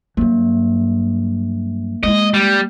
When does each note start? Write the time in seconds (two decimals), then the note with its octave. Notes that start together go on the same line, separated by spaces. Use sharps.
0.17 G2 F#3 A#3
2.03 G#3 E4 D#5
2.34 G3